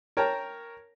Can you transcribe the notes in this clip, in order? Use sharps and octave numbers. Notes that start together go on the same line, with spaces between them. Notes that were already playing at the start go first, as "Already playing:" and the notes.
A#4 C#5 G5 A5 A#5